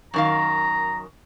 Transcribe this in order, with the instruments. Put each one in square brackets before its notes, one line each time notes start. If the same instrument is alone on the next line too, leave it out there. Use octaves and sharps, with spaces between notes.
[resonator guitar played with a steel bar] F#2 D#3 F5 [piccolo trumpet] A#5